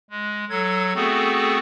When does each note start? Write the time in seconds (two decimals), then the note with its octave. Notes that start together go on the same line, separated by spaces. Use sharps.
0.10 G#3
0.50 F#3 A4 G#6
0.94 A3 B3 C4 F#4 G#4 A4